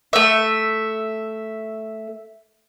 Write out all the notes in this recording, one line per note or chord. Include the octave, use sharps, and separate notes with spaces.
A3 E5